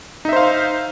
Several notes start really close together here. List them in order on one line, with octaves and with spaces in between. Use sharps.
D#4 E5 C5 F5